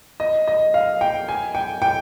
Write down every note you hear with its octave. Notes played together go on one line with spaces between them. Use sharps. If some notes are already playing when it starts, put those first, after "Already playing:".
D#5
D#5
F5
G5
G#5
G5
G5